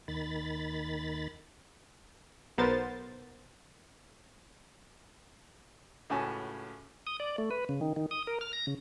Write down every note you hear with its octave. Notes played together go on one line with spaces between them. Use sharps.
D#2 D#3 B5 A6
B1 B3 A#4 C5 A6
C#2 A2 C#4 F#4 G#5 A5
D#6
D5
A3
B4
C#3
D#3
D#3
D#6
A#4
F6
A#6
C#3